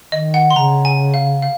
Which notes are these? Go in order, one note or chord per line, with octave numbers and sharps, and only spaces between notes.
D#3 D#5
F#5
C6
C#3 A#5
G#5
F5
F5